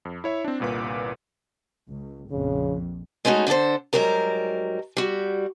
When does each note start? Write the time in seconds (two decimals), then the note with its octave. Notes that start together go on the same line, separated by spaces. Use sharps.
0.05 F2
0.24 E4 C#5 E5
0.44 C4 D4
0.60 G1 C2 A#2 B4 D6
1.90 C#2
2.31 A#1 F2 C#3
3.25 G#3 A3 C#4 D#4 F#4
3.47 D3 D4 G4 A4 C5
3.93 G#2 F#3 G3 A#4 A#5
4.97 G3 F#4